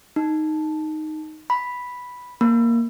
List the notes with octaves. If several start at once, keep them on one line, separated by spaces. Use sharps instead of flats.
D#4
B5
A#3